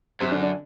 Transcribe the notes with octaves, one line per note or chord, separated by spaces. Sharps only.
F#2 C3 C4
D3 D4
D3 D4